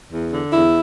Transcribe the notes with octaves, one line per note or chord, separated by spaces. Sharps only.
E2
D3
E2 E4